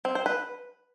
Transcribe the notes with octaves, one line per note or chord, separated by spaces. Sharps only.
C4
C5
B4